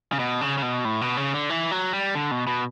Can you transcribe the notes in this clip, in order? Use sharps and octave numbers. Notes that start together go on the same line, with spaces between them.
C#3
B2
C#3
C#3
B2
A2
B2
C#3
D3
E3
F#3
G3
D3
B2
B2